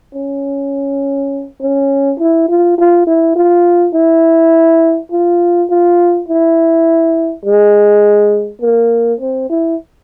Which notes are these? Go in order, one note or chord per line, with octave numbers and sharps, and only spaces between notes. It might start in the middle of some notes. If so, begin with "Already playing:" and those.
C#4
C#4
E4
F4
F4
E4
F4
E4
F4
F4
E4
G#3
A#3
C4
E4